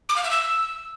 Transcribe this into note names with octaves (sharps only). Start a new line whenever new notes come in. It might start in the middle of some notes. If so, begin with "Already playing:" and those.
D6
F5
E5
E6